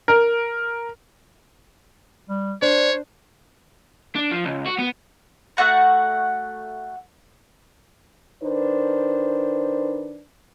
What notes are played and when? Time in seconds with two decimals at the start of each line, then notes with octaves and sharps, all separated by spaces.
0.08 A#4
2.29 G3
2.62 D4 C5 C#5
4.16 D4
4.31 F3
4.45 C#2
4.66 F#4
4.79 B3
5.57 A3 F#4 F#5 A#5
8.43 D#3 D4 B4 C5